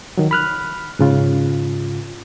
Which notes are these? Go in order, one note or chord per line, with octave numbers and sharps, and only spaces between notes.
D#3 F#3
B5 F6 F#6
G#2 C#3 F4